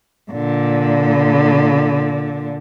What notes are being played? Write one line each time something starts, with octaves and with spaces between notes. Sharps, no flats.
A#2 D3